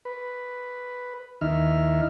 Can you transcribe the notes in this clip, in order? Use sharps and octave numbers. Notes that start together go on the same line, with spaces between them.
B4
D#2 D#3 D#4 E4 E5 F6